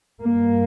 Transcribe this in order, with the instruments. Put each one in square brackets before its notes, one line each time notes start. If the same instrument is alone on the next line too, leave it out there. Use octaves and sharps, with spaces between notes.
[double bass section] G2 A#3